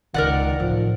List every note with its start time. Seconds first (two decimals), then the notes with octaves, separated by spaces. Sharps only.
0.14 C#2 D#3 A#4 D5 F#5
0.60 A1 F3